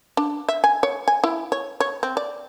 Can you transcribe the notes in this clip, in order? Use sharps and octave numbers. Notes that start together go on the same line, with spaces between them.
D4
E5
G#5
C#5
G#5
E4
C#5
C#5
C4
D5